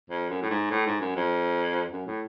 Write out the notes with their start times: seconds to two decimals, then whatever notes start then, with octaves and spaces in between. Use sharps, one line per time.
0.10 F2
0.30 F#2
0.42 A2
0.50 G#2
0.71 A2
0.86 G#2
1.00 F#2
1.16 F2
1.92 F#2
2.07 A2